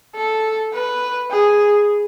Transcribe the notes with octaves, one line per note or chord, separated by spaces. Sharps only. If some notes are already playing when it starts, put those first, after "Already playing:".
A4
B4
G#4